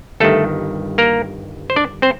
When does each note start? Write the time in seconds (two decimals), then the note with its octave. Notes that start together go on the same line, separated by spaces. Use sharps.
0.20 G1 G2 D#3 A3 A4
0.98 A#3 A#4
1.70 C5
1.76 D4 D5
2.02 C4 C5